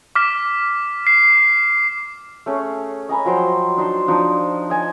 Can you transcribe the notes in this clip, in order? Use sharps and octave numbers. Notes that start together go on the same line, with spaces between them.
D6 F6 B6
C7
A3 C#4 G#4
D#5 G#5 A#5 B5
F3 F#3 C5 G5
D4 D#4 A5 C6
F3 D4 D#4
D#5 G#5 A5